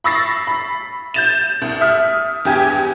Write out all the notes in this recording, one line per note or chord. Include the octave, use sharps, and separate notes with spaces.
B5 C#6 E6 A6 A#6 C7
B5
G6 A6 E7
C2
E5 D#6 F6
E2 G2 G4 G#5 G#6